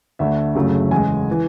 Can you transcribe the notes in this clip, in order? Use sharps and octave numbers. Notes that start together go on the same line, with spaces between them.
D2 D3 A3 E5
F#1 F#2 C#3 F#3 A3
E2 C#3 G#3 G#5
E3